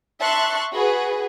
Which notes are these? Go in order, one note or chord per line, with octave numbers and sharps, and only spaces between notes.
E5 A5 C6 C#6 F#6
F#4 G#4 B4